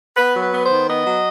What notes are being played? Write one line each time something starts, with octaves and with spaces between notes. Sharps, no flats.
B3 B4
F#3
B4
B3
C5
D#3
B3 D#5
F#3